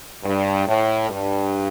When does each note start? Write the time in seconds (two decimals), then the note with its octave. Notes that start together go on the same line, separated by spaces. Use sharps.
0.23 G2
0.66 A2
1.09 G2